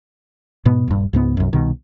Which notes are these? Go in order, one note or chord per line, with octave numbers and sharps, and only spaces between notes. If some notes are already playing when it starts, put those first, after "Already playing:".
G#2 B2 B3
D#1 G2
C#2 G#2 B3
B1 F#2
C2 B2 D#3